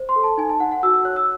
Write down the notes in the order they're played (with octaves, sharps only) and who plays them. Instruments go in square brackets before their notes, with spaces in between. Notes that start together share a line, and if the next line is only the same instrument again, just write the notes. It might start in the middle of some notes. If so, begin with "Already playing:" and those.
Already playing: [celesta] C5
C6
A4
A5
D#4 G#5
A5
D#4 F#5
F#5
F#4 E6
E6
C#5 F#6
E6